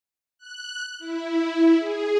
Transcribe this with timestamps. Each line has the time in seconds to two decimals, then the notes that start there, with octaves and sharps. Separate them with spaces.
0.38 F#6
0.99 E4
1.78 G#4